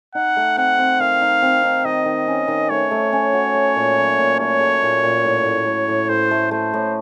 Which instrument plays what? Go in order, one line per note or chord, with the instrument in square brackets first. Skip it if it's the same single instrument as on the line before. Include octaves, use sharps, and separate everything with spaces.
[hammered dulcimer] D#4 [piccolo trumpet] F#5
[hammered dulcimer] A3
[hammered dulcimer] C4 [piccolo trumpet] F#5
[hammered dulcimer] C4
[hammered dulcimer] D#3 [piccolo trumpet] F5
[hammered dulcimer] D#4
C4
D#4
[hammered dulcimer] D#3 [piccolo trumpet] D#5
[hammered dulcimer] D#3
C#4
D#3
[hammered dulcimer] A3 [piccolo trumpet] C#5
[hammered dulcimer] A3
C#4
F#4
A3
A#2
F#3
A#2
[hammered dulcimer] A3 [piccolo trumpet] C#5
[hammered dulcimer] A3
A#2
A#2
A2
A2
A2
A2
[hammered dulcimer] A2 [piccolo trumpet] C5
[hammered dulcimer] A3
[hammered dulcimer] A3 [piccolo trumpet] C5
[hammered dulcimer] A2